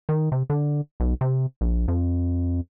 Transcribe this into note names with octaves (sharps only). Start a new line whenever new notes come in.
D#3
C3
D3
B1
C3
A#1
F2